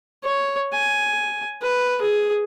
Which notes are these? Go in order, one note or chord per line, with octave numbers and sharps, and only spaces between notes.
C#5
G#5
B4
G#4